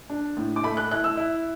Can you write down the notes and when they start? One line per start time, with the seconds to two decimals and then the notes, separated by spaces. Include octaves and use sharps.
0.10 D4
0.37 A2
0.56 D6
0.63 A3 B5
0.77 F#6
0.91 E4 F#6
1.04 E6
1.17 E4